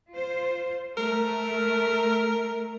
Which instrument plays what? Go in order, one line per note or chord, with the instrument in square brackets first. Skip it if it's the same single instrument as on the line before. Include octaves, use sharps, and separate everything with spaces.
[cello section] F4 C5
[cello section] A3 [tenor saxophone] A#4